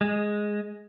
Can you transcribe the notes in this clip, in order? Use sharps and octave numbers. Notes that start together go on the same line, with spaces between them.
G#3